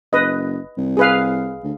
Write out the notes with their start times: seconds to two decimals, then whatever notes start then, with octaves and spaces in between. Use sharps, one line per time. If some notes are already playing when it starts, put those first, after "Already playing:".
0.13 F#1 B4 D#5
0.77 C2
0.97 G#4 B4 F5
1.64 D2